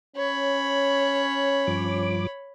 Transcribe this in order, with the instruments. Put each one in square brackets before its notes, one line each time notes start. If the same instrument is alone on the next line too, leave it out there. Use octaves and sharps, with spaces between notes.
[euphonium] C#4 [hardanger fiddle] C#5 B5
[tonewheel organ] G2 F3 D6